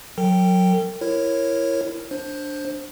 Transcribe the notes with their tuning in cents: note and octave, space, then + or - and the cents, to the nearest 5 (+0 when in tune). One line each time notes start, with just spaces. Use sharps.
F#3 -15 A#4 -45 G5 +0
E4 +20 A#4 +0 C#5 -15
D4 +0 C5 +15